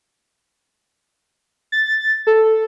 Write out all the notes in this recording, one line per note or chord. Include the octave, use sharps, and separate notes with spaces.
A6
A4